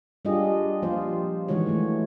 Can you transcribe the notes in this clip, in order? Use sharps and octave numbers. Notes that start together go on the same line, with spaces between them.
G3 D4 F4 G4 G#4 D#5
F3 A#3 F4 C5
D#3 E3 G#3 F#4 C#5
E3 A3